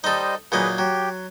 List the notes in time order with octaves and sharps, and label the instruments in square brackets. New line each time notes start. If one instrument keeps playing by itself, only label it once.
[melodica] G3 C5 D#5 [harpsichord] D#4 A4
[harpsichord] A#2 F#3 D#4 [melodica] G#4 B4
[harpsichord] F#3 [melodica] G4 G5